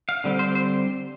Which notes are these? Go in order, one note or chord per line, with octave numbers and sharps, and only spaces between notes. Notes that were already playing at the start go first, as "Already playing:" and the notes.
F5
D3 G3 C4
C5
C5